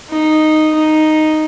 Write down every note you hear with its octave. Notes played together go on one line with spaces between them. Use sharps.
D#4
D#4